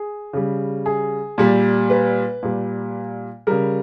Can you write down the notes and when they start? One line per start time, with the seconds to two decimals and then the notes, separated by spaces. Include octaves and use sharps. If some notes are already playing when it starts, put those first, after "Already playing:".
Already playing: G#4
0.33 C#3 G3
0.86 G#4
1.38 A#2 G3
1.90 B4
2.43 A#2 G3
3.47 C#3 G3 A#4